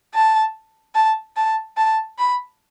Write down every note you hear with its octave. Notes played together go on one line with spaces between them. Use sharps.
A5
A5
A5
A5
B5